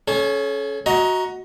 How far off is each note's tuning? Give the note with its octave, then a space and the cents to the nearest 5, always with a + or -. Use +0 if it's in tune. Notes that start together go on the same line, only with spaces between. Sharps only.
C#4 +0 A4 -40
F#4 +0 D#5 +25 A#5 +10